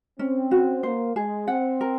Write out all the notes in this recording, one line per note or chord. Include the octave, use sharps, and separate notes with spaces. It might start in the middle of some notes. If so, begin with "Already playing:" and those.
C4 C#4
F#4
A#3 C5
G#3 G#4
C4 F#5
A#4